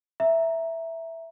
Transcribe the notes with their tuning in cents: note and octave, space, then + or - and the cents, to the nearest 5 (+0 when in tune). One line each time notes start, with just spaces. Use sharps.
E5 +0 A#5 +0